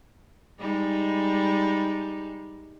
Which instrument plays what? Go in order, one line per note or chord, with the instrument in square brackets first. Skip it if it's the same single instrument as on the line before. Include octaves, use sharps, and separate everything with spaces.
[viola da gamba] G3 G#3 D#4